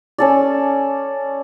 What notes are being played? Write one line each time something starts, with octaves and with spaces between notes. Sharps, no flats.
C#4 A4 D5